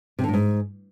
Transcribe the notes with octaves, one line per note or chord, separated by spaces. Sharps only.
C3
D3
A2
G#2